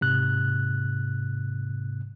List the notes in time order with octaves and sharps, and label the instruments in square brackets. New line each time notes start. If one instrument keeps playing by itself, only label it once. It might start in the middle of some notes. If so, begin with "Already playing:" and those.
[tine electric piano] G#2 C3 F#6